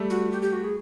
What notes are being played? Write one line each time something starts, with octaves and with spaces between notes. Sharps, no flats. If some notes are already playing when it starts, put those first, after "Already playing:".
Already playing: G3 A3
F#4
G4
G4
F#4
G#4